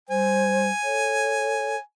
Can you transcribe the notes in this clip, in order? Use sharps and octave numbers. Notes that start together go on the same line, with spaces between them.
G3 C5 G#5
A4 C#5